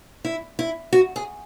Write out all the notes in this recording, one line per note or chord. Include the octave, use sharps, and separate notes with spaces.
E4
E4
F#4
G#4